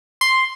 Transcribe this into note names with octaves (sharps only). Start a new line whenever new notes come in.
C6